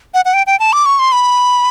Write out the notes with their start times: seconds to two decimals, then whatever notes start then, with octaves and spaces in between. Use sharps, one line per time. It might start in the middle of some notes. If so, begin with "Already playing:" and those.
0.14 F#5
0.25 F#5
0.34 G5
0.47 G5
0.60 A5
0.73 D6
0.86 C#6
0.99 C6
1.12 B5